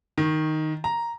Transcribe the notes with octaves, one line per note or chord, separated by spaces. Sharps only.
D#3
A#5